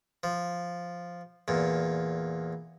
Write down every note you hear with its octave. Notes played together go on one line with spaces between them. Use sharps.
F3
E2 A#2